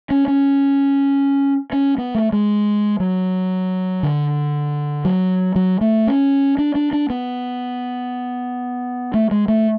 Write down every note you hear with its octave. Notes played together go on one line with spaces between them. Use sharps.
C#4
C#4
C#4
B3
A3
G#3
F#3
D3
F#3
F#3
A3
C#4
D4
D4
D4
B3
A3
G#3
A3